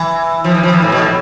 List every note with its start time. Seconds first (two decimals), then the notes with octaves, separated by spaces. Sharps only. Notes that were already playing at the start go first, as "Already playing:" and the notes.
Already playing: E3
0.44 F3
0.54 E3
0.63 F3
0.73 E3
0.82 A2
0.92 B2
1.02 A2